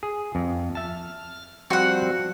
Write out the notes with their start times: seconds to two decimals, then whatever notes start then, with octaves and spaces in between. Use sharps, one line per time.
0.03 G#4
0.35 F2
0.75 E5 A5 F6
1.70 F3 G3 C4 F#4 F#5